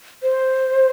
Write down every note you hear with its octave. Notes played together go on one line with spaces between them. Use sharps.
C5